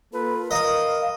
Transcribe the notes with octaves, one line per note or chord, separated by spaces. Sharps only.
A#3 F4 A4 B4
A#4 D#5 F5 D#6